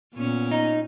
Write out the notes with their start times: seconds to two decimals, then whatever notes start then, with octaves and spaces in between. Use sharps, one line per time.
0.14 A#2 B3 C#4
0.51 D#4